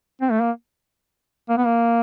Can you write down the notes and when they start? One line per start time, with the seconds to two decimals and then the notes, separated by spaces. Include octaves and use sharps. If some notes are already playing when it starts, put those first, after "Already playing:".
0.21 C4
0.31 A3
0.42 A#3
1.49 A#3
1.57 B3
1.65 A#3